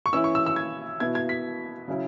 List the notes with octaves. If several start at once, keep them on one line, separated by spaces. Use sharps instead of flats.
C#6
E3 C#4 E4 E6
C#6
E6
E6
G#6
B2 B3 E4 G#6
G#6
B6
C#3 F#3 C#4 E4